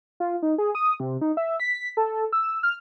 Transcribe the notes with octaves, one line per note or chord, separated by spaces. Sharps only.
F4
D#4
G#4
D#6
C3
D#4
E5
B6
A4
E6
F6